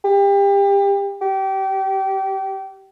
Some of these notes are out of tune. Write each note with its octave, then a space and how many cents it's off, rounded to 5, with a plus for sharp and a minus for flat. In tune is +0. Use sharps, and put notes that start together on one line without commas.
G4 +30
G4 -25